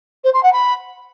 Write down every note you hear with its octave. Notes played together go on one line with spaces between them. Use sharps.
C5
C6
F#5
B5